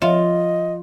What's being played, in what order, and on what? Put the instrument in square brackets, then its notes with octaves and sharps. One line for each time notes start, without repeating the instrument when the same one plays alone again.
[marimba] F3 C#5 E5 [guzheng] F4 [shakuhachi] D#5